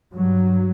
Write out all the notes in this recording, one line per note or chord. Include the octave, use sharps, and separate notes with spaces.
G2 F#3